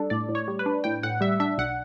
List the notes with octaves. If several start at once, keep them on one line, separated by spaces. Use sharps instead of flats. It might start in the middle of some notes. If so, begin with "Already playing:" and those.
Already playing: G3 D4 A4
A2 D5
A2
C#5
G3
B4
D4
A2 G5
A2 F#5
G3 E5
D4 E5
B1 F#5